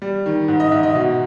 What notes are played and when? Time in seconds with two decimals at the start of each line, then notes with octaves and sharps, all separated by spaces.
0.02 G3
0.26 D#3
0.48 G#2
0.60 D#5
0.72 G#2 E5
0.83 D#5
0.95 B2